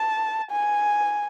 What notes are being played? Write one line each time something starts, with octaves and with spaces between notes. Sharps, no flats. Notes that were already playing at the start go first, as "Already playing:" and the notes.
Already playing: A5
G#5